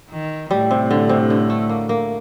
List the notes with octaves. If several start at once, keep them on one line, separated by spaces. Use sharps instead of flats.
D#3
A2 G3
C3
D3
C3
D3
A3
A#3
A#3